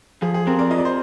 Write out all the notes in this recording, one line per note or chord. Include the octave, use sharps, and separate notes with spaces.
F3 G#4
G#4
C4 G4 A#4
A#4 D5
F4 D#5
D5
C5